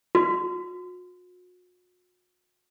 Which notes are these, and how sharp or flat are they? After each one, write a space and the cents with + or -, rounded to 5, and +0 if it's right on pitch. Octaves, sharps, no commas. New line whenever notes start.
F#4 -40